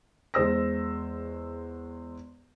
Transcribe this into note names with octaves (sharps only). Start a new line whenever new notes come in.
E2 G#3 C5 E6 A#6